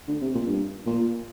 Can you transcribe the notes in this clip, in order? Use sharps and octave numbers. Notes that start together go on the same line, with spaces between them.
D3
C3
A#2
G2
A#2